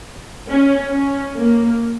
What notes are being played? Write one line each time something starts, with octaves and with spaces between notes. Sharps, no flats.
C#4
C#4
A#3